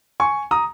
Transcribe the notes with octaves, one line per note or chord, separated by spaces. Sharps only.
G#5 C#6
A#5 D#6